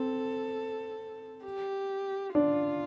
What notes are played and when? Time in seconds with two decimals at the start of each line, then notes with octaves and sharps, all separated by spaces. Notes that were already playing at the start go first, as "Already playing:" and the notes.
Already playing: C4 A4
1.44 G4
2.35 D4 F4